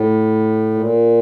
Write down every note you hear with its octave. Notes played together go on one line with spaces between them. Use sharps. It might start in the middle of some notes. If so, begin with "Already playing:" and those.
Already playing: A2
A#2